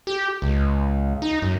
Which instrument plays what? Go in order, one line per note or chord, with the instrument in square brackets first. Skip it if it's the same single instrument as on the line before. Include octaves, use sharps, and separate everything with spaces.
[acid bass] G4
C#2
D#4
F#2